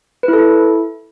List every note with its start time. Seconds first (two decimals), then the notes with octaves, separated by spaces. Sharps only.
0.23 B4
0.28 E4
0.33 A4
0.38 E4